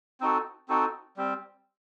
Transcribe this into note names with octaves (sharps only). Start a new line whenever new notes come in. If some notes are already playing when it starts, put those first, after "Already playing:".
C4 D#4 F#4 A4
C4 D#4 F#4 A4
G3 C4